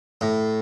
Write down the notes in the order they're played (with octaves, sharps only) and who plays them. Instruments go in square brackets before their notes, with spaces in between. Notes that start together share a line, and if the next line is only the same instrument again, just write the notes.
[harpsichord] A2